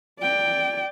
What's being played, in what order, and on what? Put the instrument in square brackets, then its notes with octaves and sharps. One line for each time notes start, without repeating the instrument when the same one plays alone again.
[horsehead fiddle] D5 G5